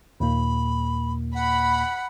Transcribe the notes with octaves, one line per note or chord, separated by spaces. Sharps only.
D#2 A#2 A#3 B5
F#5 B5